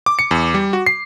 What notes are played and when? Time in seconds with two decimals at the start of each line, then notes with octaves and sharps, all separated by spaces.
0.06 D6
0.19 C#7
0.31 E2
0.54 G3
0.73 F#4
0.86 C7